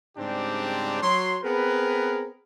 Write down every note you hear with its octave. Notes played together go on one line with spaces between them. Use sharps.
G#2 C#3 G3 C4 D4 G4
F#3 C6
B3 C4 G#4 A#4 B4